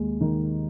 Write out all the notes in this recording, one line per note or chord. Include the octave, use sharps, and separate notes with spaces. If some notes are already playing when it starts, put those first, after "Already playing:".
Already playing: D#2 G#3
D#3